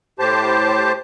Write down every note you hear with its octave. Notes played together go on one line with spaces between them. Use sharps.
A2 G4 C5 A5